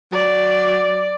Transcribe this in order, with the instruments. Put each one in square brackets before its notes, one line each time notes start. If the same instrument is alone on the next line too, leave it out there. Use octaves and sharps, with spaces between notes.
[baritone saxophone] F#3 [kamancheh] D5